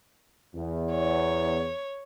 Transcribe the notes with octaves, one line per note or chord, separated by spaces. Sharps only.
E2
C#5